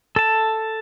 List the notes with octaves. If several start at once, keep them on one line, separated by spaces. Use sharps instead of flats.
A4 A5